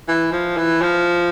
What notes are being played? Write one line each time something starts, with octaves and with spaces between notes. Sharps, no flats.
E3
F3
E3
F3